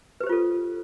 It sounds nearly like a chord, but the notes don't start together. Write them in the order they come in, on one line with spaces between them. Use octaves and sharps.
B4 G4 C5 F4 A4